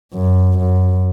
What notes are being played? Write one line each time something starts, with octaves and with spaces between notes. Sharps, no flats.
F#2
F#2